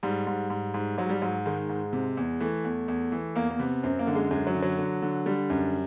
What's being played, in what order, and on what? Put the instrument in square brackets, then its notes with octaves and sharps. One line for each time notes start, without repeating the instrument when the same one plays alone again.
[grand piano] G#2 G3
G#2
G#2
G#2
G#2 F#3
G3
G#2 F#3
D#3 G#3
G#2
C3
E2
E3 A3
E2
E2
E3
E2 A#3
A#3
C3 B3
F#2 C4
A#3
D3
G#3
F#2 G#3
F#3
D3
F#3
D3
D3
D3 G3
F#2